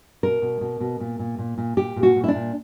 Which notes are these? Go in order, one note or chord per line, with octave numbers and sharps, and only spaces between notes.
B2 A#4
B2
B2
B2
A#2
A#2
A#2
A#2
A#2 G4
A#2
F#4
A#2
E4
D4
A#2